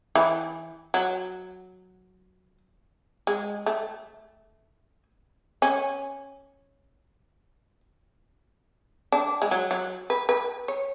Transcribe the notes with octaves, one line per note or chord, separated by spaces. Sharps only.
E3
F#3
G#3
A3
C#4
D4
G#3
F#3
F#3
B4
B4
C#5